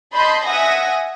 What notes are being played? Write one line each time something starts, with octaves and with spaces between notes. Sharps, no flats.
D#5 A5 B5 C6 G6
E5 F#5 G#5 D#6 A#6